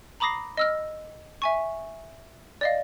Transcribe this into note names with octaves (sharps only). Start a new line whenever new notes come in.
A#5 B5 D6 D#6 A#6 C7
D#5 E6 F6
E5 G#5 C#6
D5 D#5 F5